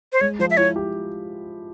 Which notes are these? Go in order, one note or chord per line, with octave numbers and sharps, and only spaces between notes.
C5
G#3 C#5
F3 C5
E5
E4 C#5
G4